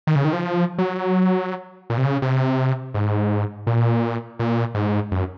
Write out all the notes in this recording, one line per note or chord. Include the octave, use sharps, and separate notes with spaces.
D#3
C#3
D#3
F3
F#3
A#2
C3
C#3
C3
G#2
A#2
A#2
G#2
F#2